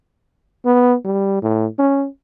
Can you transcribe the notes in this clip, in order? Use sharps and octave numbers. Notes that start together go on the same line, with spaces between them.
B3
G3
A2
C#4